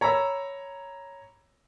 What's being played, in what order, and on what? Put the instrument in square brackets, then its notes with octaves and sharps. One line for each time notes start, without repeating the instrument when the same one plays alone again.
[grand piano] C#5 A#5 B5 E6